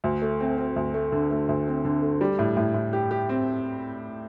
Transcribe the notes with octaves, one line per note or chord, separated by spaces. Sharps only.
D2
A3
C4
C4
D2
A3
D3
A3
D2
C4
D3
A3
G3
A2
A2
A2
G4
G4
C4